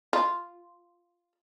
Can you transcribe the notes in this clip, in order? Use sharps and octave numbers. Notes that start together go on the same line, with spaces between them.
F4